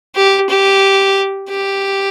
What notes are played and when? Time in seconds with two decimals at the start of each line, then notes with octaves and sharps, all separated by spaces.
0.16 G4
0.49 G4
1.50 G4